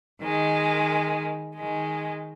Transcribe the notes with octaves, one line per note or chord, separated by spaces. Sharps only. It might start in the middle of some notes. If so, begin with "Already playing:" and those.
D#3 G#3
D#3 G#3